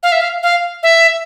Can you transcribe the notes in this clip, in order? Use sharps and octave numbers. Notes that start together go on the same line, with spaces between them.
F5
E5
F5
F5
E5